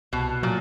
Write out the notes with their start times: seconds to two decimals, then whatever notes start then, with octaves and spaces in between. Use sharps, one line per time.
0.13 C2 B2
0.43 A#2 F#3